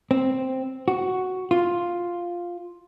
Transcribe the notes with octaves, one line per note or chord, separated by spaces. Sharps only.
C4
F#4
F4